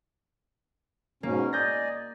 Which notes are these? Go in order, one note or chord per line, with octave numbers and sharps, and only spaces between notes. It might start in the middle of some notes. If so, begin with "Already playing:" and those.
G#2 B2 A#3 C#4
D5 D#5 G#5 G6 A#6